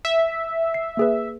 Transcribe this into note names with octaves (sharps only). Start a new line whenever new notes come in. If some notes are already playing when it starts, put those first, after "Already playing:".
E5
C7
A#3 G#4 B4